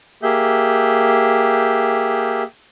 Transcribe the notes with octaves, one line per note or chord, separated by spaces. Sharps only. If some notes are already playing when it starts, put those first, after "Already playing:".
A#3 G4 G#4 E5 G6